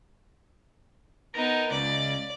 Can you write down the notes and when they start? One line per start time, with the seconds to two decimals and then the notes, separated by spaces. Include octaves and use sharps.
1.35 B3 D#4 A#4
1.71 C#2 D5